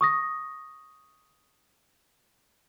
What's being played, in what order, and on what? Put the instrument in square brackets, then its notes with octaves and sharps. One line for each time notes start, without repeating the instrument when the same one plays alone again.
[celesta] C#6 D#6 A#6